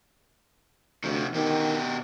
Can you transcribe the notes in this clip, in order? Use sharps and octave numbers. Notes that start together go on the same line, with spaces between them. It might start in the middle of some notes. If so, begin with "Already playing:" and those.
D2 C3 F3
B2 D#3 G4